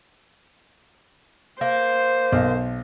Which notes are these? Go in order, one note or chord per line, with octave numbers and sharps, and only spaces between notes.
A#3 C5
B1